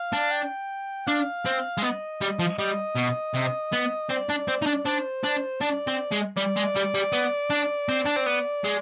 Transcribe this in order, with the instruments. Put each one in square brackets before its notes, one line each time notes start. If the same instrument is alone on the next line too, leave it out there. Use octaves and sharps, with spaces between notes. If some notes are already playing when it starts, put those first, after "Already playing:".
Already playing: [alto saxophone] F5
[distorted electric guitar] D4
[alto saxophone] G5
[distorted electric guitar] D4 [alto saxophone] F5
[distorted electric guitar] C4
G#3
[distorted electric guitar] B3 [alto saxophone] D#5
[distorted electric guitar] G3
F3
[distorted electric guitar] G3 [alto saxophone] D#5
[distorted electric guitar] B2
C3
B3
[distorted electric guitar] C4 [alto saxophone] D5
[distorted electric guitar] D4
C4
D#4
D4
[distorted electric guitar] D4 [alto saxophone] C5
[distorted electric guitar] D4
[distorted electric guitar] D4 [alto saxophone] D5
[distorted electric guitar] C4
G#3
[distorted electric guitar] G3 [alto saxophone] D5
[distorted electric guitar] G#3
G3
G3
B3
D4
C4
D4
C4
B3
G#3